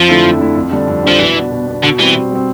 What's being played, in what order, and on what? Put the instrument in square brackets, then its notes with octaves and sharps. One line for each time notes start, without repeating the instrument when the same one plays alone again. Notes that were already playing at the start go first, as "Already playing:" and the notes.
Already playing: [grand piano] F2 [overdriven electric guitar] F3
[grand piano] D3 A3 E4
F2
D3 A3 E4
F2
D3 G3 D4
F2
[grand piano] D3 G3 D4 [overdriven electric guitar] F3
[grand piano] B2 [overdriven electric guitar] E3
[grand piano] B3 D4
B2
B3 D4
[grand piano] B2 [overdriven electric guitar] D3
[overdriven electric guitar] E3 [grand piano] G3 C4
[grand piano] B2
G3 C4